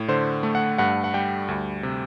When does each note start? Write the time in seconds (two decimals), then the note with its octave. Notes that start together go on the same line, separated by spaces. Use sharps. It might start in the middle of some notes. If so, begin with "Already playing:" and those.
Already playing: A2
0.08 D3 C5
0.43 A3
0.55 F#5
0.78 G2 F#5
1.04 F#5
1.14 G3 G5
1.48 D2
1.83 C3